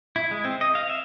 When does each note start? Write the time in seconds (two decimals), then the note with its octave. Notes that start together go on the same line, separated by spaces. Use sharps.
0.16 E4
0.31 G#3
0.45 C4
0.61 D#5
0.75 F5
0.90 E5